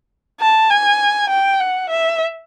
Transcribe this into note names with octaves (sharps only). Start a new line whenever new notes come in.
A5
G#5
G5
F#5
E5